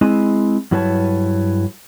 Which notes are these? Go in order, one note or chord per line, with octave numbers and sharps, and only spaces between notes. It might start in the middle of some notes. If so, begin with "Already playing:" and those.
G#3 C4 E4 D#5
G2 F#3 E4 B4 C#5 A5